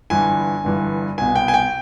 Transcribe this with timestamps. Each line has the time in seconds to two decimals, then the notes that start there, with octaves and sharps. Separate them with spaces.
0.10 G1 G2 E3 G#5
0.64 G1 G2 E3
1.18 C2 B2 G#5
1.35 G5
1.48 G#5
1.54 G5